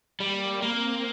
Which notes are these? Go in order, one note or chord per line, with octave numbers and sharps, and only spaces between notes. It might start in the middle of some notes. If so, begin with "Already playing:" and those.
G3 A#3
A#3 C4